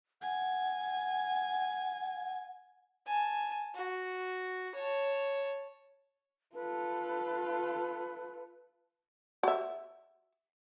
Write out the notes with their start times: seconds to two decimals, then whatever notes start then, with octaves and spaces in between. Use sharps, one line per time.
0.22 F#5 G#5
3.06 G#5 A5
3.75 F#4
4.75 C#5 A5
6.55 F4 A4 B4
9.43 F#4 E5